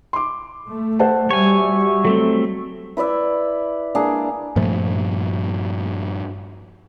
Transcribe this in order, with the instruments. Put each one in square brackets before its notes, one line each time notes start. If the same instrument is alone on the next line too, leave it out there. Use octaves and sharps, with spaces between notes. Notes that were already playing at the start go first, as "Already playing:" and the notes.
[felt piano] C6 D6
[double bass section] A3
[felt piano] C5 F#5 A5
[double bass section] G3 [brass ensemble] F#4 G4 E5 [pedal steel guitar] C#5 G#5
[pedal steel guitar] F#3 A3 C4 [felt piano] A4
[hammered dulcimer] E4 B4 D5 E5
A#3 D4 G#4
[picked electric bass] G2 A#2 F3 A3